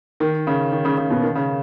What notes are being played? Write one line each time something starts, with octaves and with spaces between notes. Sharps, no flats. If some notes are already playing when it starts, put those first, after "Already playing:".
D#3
C#3
D#3
C#3
C#3
B2
D#3
C#3